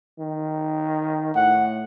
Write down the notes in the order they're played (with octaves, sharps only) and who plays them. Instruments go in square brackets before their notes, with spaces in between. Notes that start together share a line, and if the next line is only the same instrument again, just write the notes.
[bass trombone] D#3
[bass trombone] A2 [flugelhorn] F#5